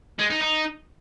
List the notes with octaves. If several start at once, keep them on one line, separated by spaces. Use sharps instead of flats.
G#3
D#4
D#4